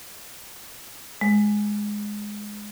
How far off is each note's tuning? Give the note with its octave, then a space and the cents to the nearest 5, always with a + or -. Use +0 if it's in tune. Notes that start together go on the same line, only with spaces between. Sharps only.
G#3 +0